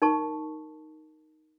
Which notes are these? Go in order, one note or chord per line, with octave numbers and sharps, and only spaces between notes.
D#4 A#4 A5 C#6